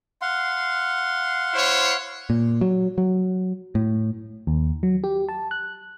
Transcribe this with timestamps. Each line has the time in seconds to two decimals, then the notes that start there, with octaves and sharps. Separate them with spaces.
0.22 F5 F#5 C6
1.54 E4 C5 C#5
2.30 A#2
2.61 F#3
2.98 F#3
3.75 A2
4.47 D#2
4.83 F#3
5.04 G4
5.29 A5
5.51 F#6